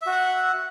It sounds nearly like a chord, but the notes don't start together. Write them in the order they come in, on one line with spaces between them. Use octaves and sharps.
E5 F#4 F#5